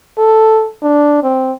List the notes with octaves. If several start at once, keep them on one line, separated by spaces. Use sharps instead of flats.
A4
D4
C4